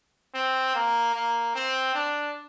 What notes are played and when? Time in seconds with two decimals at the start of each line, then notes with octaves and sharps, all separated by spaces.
0.34 C4
0.75 A#3
1.15 A#3
1.55 C4
1.95 D4